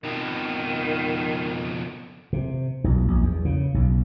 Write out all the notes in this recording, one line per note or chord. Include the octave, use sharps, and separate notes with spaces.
F2 B2 D#3
C3
B1
A#1
E2
C#3
B1